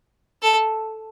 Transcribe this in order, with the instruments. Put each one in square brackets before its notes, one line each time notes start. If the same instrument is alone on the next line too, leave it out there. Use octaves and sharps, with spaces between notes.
[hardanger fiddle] A4